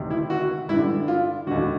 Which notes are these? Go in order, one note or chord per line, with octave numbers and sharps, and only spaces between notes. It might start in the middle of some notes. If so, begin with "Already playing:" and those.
Already playing: D2 C3 D#3
E4
F#4
G2 D3 E4
F4
D#2 D3 F#4